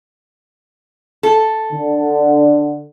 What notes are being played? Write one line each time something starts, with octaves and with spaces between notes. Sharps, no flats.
A4
D3